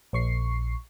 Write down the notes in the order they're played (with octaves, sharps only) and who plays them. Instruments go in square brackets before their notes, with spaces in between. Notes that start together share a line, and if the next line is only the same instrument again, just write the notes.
[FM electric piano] A#1 C#6 C7